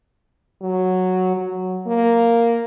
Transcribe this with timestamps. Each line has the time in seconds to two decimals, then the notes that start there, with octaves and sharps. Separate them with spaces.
0.62 F#3
1.37 F#3
1.87 A#3